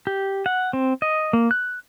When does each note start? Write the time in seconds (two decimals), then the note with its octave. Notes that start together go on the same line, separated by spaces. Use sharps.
0.07 G4
0.46 F#5
0.73 C4
1.02 D#5
1.33 A#3
1.51 F#6